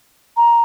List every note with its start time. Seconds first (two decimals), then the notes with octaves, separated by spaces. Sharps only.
0.37 A#5